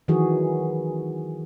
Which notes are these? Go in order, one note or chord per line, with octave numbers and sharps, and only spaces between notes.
D#3 E3 F#3 F#4 G#4